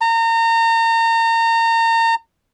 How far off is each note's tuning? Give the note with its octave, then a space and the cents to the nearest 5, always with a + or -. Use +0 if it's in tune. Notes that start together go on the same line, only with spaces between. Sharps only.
A#5 -30